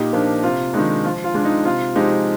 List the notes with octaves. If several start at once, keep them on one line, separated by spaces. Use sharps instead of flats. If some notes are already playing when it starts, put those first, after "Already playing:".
Already playing: A#2 D#4 G4
F3 A#3 D4
C3 F4
D#3 G#3 D4 D#4
F3 F4
F4
G#3 D4
D#4
C3 F4
F3 G#3 D#4 G4